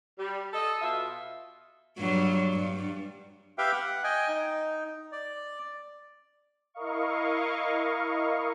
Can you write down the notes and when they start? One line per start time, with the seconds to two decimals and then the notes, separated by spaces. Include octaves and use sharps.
0.18 G3
0.53 A4 D#5
0.81 B2 F4 E5
1.98 G2 F#3
2.53 G2
3.58 G4 B4 E5 F5 G5
3.73 F#5
4.04 D#5 G5 G#5
4.28 D#4
5.12 D5
6.74 E4 A#4 D#5 F5 C#6